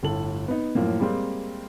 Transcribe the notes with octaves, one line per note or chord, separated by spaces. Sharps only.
G1 A2 A3 A4 F#7
B3 D#4
F#2 A2 F3 A#3
G3 G#3 A#3 C4